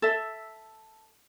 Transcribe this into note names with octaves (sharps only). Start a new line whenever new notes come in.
A4 E5